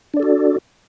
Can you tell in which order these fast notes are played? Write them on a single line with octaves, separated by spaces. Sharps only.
D4 D5 A4 F#4